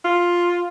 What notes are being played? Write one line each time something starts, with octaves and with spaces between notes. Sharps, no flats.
F4